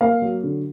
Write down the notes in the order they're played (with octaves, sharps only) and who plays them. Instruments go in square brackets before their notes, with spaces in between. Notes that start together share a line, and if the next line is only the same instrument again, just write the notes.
[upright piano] A#3 F5
F#3
D3